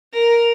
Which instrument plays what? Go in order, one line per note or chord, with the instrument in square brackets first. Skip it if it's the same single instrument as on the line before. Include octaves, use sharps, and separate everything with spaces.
[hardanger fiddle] A#4